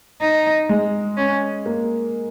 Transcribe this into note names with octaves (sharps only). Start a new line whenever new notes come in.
D#4
G#3
C#4
A#3